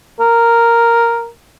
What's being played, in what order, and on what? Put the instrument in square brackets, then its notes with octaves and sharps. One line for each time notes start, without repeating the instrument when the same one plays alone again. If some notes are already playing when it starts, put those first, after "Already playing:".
[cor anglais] A#4